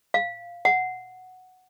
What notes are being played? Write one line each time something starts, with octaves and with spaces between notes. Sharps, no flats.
F5
F#5